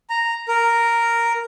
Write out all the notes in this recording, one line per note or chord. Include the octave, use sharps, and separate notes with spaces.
A#5
A#4